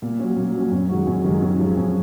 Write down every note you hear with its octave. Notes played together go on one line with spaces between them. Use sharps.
A#2
F#3 C#4
A#2
F#3 C#4
F#2
D#3 G#3 C#4 F#4
F#2
D#3 G#3 C#4 F#4
F#2
F3 G#3 C#4
F#2